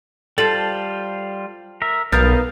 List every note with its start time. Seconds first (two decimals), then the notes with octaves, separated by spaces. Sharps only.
0.38 G3 F4 A4 C5 A6 F#7
1.82 A#4 E5
2.12 B1 B3 D#4 A#4 F5 F6 G6 A6